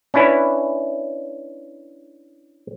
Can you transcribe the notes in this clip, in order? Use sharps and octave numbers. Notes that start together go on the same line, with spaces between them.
C#4 D4 E4 B4